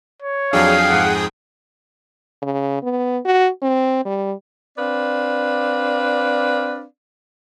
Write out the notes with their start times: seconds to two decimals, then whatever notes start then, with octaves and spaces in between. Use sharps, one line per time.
0.22 C#5
0.53 F2 F#3 D4 G#4 F5 G5 D#6
0.90 F2 G#2 F#5
2.43 C#3
2.83 B3
3.25 F#4
3.62 C4
4.05 G3
4.78 C4 D4 B4 D5 F5